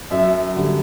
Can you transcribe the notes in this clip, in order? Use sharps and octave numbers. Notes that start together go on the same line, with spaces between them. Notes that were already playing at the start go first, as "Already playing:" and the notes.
F#2 E5
D3 G3